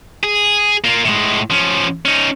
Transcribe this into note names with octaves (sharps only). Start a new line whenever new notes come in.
G#4
A#3 F4
A2 G#3
F3 C#4
C#4 D#4